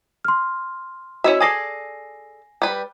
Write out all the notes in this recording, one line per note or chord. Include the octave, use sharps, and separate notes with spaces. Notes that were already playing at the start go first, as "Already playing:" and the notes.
C6 F6
C#4 E4 F#4 D#5 E5
G#4 A4 D5 G#5 A#6 C7
G3 B4